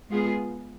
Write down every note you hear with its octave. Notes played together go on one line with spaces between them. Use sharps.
G#3 B3 F4 G#4